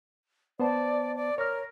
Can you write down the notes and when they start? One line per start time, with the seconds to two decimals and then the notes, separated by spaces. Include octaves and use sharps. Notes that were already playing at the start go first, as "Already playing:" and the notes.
0.60 B3 C5 D5 A5
1.16 D5
1.38 A#4 C#5 F6